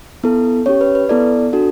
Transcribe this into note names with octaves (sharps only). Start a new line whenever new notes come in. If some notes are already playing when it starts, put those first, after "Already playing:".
B3 E4 A4
C#4 G4 C#5
B4
B4
B3 E4 A4 D5
D4 F#4 A4